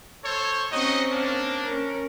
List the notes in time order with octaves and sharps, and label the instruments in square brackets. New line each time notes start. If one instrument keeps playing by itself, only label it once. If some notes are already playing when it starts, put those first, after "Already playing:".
[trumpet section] A4 C5 C#5
[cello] C4 C#4 [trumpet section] D#4 F#4 D#5
[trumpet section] A#3 D4
[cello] C#4 A#4